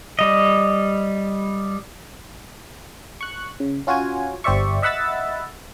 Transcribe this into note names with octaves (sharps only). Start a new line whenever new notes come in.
G3 D#5
C#6 F#6
C#3
C#4 F4 F#4 C#5 G#5
G1 G4 C5 D5 E5 C#6
D#5 E5 F#5 B5 E6 A6